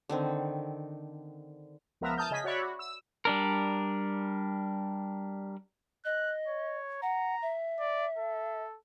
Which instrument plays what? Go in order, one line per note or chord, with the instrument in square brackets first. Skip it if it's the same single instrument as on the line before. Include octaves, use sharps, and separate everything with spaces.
[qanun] D3 D#3 C4
[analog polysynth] C#2 F3 B3 A#4 E5 A#5
A5 D#6 F6 G6
C#3 G#4 D#5 G#5 B6
F#4 C#5 D5 E5 B5
F#4
E6
[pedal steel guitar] G3 D4 A#4
[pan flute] D#5 [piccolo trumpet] F#6
[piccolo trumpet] C#5
[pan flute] F#5 [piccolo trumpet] A#5
[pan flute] E5
[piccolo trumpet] D5
A4